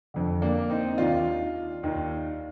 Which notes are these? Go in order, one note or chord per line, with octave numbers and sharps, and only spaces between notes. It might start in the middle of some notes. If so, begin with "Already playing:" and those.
F2 D3
A#3 D4
C4 D#4
D#4
D#2 D#3 D4 F4
D#2 D#3